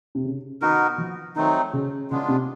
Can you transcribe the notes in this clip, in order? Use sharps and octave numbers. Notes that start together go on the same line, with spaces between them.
C3
C#3
D#3 B3 D#4 F#4 A#4
F3
D#3 F#3 A3 C4 D#4
C#3
C#3 G#3 B3 D4 F4
C3